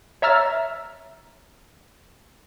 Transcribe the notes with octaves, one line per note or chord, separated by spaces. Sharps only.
C#5 E5 A#5 E6 F6 A6